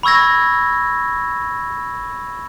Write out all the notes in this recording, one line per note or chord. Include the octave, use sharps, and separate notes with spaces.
B5 C#6 E6 G#6 A#6